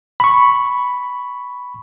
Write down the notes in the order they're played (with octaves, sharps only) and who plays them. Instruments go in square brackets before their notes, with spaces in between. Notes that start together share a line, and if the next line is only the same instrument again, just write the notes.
[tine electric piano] B5 C#6